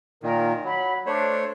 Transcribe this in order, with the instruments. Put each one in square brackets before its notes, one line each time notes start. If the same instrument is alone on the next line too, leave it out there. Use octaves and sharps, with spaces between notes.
[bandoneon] A#2 D#3 [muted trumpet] A#4
[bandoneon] F#3 [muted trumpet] B5
[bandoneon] A3 C5 C#5 [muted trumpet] D4